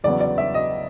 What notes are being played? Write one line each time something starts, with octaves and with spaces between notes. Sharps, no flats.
E2 C#3 F#3 B3 D5
D5
E5
D#5